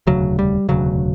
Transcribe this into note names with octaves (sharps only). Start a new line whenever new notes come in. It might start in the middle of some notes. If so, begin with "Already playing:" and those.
E1 D2 C#3 F#3
G3
E1 D2 C#3 F#3